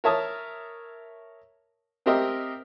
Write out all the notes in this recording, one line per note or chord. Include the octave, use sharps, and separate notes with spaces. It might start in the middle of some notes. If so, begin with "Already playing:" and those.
A#4 C#5 E5 A5 D#6
C4 G4 A#4 D#5 E5